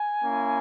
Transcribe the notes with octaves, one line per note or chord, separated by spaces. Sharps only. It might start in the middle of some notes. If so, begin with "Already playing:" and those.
Already playing: G#5
A#3 C#4 E4